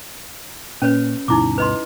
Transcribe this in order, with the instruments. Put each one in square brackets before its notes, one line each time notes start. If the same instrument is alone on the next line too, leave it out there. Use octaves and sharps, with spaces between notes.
[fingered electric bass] A#2 [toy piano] C#4 B4 C#5
[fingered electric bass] D2 G2 B2 [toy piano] D#4 E4 D6
[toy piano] B4 D#5 C6